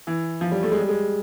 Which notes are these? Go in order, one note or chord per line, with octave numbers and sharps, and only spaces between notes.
E3
F3
G3
A3
G#3
G3
G#3